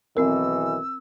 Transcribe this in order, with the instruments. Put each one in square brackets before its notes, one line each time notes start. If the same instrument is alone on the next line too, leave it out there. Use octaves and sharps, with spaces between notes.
[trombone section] B1 D#3 E3 [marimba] C4 A#4 [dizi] E6